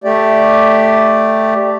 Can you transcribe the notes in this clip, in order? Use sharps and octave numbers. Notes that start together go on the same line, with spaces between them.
A3 G4 D5